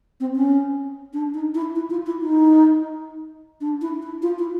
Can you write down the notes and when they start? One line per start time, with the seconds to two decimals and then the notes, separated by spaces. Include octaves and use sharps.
0.20 C4
0.36 C#4
1.13 D4
1.34 D#4
1.55 E4
1.76 E4
1.90 F4
2.06 E4
2.22 D#4
3.61 D4
3.81 E4
4.02 E4
4.22 F4
4.38 E4